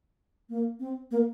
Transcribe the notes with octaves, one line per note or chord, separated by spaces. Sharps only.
A#3
C4
A#3